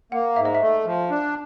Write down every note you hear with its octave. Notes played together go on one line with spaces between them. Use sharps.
A#3 F#5
G#2 E5
D#5
E5
A3
F3
D4